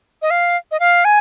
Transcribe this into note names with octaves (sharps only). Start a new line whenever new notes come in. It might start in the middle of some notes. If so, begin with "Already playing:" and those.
D#5
F5
D#5
F5
G#5